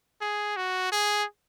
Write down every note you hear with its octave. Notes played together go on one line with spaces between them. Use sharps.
G#4
F#4
G#4